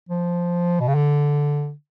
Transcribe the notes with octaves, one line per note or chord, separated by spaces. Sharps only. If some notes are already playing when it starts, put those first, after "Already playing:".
F3
B2
C#3
D3